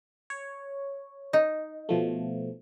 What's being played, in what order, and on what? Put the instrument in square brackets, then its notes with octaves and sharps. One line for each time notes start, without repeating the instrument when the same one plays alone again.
[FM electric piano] C#5
[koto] D#4
[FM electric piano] B2 F3 A3